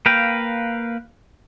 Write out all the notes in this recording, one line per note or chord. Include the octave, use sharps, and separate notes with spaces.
A#3 B4 F5 G5